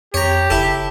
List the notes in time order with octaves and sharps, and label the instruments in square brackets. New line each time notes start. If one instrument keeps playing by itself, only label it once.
[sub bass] F2 [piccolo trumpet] G4 [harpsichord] C#5 A#5
[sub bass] F#1 [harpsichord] E4 A4